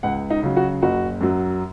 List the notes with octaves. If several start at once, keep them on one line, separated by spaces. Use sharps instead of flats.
C#2 F#5
D#4
C#3 F#3
F#4
F#1 F#4
F#2 F#3